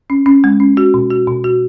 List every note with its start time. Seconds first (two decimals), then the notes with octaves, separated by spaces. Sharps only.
0.10 C#4
0.26 C#4
0.44 G#3
0.60 C#4
0.77 F#4
0.94 B2
1.11 F#4
1.28 B2
1.44 F#4